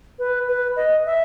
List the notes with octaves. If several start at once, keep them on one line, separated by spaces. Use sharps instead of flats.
B4
B4
D#5
E5